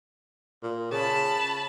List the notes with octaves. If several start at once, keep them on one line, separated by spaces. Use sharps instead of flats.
A#2
C#3 A5 B5